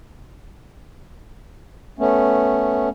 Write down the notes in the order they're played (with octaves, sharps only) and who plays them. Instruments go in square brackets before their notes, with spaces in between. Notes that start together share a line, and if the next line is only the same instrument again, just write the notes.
[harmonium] A3 B3 C#4